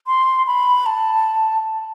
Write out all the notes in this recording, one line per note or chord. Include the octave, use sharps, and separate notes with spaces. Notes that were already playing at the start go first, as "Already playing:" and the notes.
C6
B5
A5